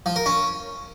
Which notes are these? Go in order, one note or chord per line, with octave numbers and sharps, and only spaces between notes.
F3
A#4
C#4